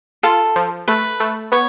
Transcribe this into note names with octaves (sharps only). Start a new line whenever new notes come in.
F4 A4
F3
A3 B4
A3
B3 C#5